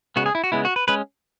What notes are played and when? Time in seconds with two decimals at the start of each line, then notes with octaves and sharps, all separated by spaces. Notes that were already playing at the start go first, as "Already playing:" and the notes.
0.16 C#3 G#3 B3 F#4
0.26 G#4
0.35 E4
0.44 F#4
0.52 C#3 G#3 B3 E4
0.65 F#4
0.76 B4
0.88 G#3 C#4 B4